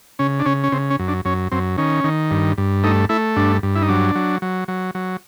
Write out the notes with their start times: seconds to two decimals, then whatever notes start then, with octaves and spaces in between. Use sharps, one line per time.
0.19 C#3 C#4
0.39 D4
0.45 C#3 C#4
0.64 C#4
0.72 C#3 C4
0.90 C#4
0.99 F#2
1.08 D4
1.25 F#2 C#4
1.52 F#2 C4
1.78 D#3 C#4
2.04 D#3
2.31 G2
2.58 G2
2.84 A3 D#4
3.09 A3 E4
3.36 G2 D4
3.63 G2
3.75 E4
3.82 D#4
3.89 F#3 D4
4.15 F#3
4.42 F#3
4.68 F#3
4.95 F#3